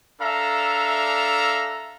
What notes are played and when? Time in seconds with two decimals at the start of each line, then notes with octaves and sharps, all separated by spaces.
0.21 D4 A4 E5 F5 A#5